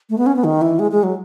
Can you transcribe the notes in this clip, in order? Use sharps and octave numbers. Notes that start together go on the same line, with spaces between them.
A3
B3
C#4
B3
D#3
E3
G#3
G#3
F#3